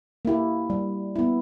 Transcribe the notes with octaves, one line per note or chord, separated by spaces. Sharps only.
A#3 E4 G4
G3
B3 E4